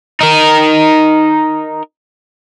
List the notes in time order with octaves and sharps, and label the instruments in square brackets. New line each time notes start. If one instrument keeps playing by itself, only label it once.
[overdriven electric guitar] D#4 A#4